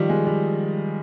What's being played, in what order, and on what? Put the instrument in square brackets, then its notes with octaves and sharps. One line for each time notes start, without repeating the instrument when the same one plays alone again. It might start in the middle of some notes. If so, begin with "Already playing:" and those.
Already playing: [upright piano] D#3 F3 G3
G#3
G3